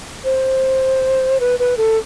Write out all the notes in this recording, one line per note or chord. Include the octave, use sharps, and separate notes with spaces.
C5
B4
B4
A4